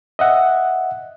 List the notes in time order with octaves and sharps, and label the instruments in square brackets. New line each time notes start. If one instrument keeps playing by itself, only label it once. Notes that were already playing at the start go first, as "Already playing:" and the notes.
[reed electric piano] D#5 E5 F#5